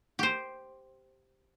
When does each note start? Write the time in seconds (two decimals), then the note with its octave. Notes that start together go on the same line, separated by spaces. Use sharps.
0.19 G4 C5